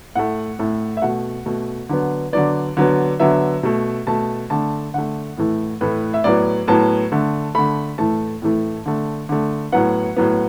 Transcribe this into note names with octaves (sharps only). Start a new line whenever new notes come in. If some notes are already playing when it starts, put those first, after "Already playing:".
A2 A3 F#5
A2 A3
E5
B2 A3 F#5
B2 A3
D3 F#3 B3
D3 F#3 B3 D5
D3 F#3 B3
D3 F#3 B3 E5
B2 A3
B2 A3 A5
D3 A3 A5
D3 A3 F#5
A2 E3 A3
A2 E3 A3 B4
E5
A2 F#3 B3 D5
A2 F#3 B3 A5
D3 A3
D3 A3 B5
A2 E3 A3 A5
A2 E3 A3
D3 A3
D3 A3
A2 F#3 B3 F#5
A2 F#3 B3